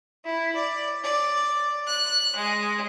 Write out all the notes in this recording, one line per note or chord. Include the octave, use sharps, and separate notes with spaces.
E4
D5
D5
F#6
G#3